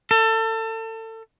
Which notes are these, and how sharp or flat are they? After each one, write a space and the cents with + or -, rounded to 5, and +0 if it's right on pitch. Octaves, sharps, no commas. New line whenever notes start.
A4 +30